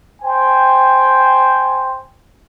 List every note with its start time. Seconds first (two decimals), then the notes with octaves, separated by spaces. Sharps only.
0.22 C5 G5 G#5